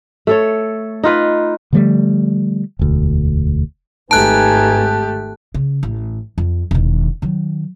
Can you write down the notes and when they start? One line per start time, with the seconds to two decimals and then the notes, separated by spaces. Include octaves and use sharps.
0.27 A3 A4 C#5
1.04 D#4 F4 B4
1.73 D3 F3 G3 A3
2.79 E1 D2
4.11 G#1 A3 D#4 G4 B4 G#5 A5 F#6
5.54 C#3
5.83 A1
6.38 F2
6.71 E1 D#3
7.22 D#3 F#3